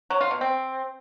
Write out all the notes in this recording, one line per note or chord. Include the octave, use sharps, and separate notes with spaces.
F#3
F4
B2
C4